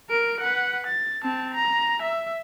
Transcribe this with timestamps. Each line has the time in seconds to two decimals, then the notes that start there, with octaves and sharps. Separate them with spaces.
0.10 A#4 D7
0.40 B4 F#5
0.87 A6
1.24 C4 A5
1.55 A#5
2.03 E5